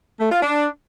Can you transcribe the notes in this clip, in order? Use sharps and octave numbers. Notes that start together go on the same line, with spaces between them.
A3
F4
D4